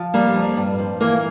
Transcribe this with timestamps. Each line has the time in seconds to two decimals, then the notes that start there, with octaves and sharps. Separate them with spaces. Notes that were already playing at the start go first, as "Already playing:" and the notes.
Already playing: F3
0.14 G3 A#3
0.35 F2
0.57 G2
0.78 F3
1.00 E3 A#3